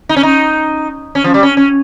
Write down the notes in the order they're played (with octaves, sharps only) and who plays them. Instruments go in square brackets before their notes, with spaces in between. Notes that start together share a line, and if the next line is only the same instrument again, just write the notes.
[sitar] D#4
C#4
D#4
C#4
F3
G3
C#4
C#4